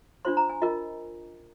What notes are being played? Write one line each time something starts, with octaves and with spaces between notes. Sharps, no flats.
D4 F4 C5 C6
A#5
G#5
F4 A#4 D#5